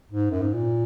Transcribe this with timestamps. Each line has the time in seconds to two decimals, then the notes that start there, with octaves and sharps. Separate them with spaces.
0.11 G#2
0.31 F#2
0.42 G#2
0.53 A#2